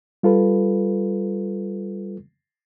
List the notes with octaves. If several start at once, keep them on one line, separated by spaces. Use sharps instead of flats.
G3 F4 A4 B4